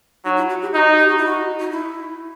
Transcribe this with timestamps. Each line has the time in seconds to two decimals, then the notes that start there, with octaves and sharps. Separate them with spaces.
0.25 F#3 D#4
0.37 E4
0.49 F#4
0.62 G4
0.74 D#4 F#4
0.98 G4
1.08 F#4
1.17 E4
1.26 F#4
1.60 D#4
1.70 E4